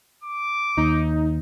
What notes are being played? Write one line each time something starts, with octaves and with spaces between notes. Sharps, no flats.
D6
D#2 D#4